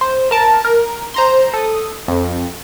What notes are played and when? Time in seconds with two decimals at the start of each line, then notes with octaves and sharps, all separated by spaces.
0.01 C5
0.31 A#4 A5
0.65 A#4
1.14 C5 A#5 C6
1.53 A4 D#6
2.08 F2